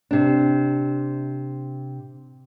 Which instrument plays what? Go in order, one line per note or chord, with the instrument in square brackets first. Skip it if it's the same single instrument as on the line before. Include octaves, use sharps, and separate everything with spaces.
[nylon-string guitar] C3 D4